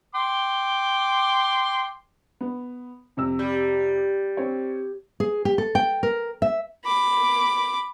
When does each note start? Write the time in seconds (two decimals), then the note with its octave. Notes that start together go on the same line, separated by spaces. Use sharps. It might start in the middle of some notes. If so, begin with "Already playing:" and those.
0.15 G5 C6 D6
2.41 B3
3.17 F2 C3 E6
3.39 G3
4.37 C4 C#5
5.20 G#4
5.45 G4
5.58 A4
5.75 G5
6.03 A#4
6.42 E5
6.85 B5 D6